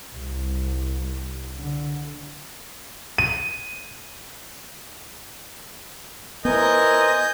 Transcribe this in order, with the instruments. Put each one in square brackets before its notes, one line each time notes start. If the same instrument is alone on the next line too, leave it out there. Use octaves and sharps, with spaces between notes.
[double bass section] C2
D3
[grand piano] D#7
[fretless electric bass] B3 [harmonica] E4 A#4 C5 [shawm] D#5 [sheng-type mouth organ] G#5 G6